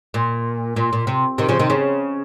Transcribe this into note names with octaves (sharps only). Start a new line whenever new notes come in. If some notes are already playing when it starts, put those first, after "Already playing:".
A#2
A#2
A#2
C3
C3 D#3
C#3 F3
C3 D#3
C#3